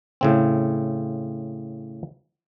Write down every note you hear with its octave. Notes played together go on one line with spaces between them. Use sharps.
A2 C#3 C4